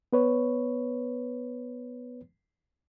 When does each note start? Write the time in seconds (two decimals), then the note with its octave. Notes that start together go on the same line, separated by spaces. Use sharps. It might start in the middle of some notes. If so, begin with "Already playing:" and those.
0.13 B3 B4 C#5